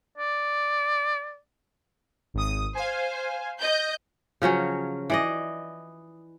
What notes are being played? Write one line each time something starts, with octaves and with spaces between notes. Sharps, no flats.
D5
G#1 D#6
C5 F5 G#5
D#5 G6
C#3 F3 F#3 C#4
E3 D5 D#5